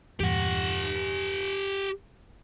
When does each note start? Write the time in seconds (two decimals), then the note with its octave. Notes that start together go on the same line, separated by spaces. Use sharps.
0.20 E2 G2 A#2 G4 F#5